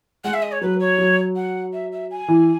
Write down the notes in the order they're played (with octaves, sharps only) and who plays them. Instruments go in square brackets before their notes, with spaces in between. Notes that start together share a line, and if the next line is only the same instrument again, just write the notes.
[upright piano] G#3 [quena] F#5
[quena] E5
D#5
C#5
[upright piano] F#3 [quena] B4
[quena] C#5
[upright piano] F#3
[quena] F#5
E5
E5
G#5
[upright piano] E3